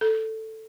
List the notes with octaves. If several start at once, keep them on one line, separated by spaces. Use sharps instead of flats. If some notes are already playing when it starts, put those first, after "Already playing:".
A4